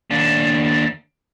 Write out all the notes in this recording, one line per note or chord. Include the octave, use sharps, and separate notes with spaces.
D#2 D4